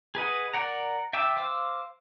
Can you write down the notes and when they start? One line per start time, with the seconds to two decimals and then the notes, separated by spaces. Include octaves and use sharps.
0.15 G#4 B4 D#5 F#5
0.54 A#4 D5 F#5 A#5
1.13 E5 G5 A5 D6 E6
1.37 C5 F5 D6 E6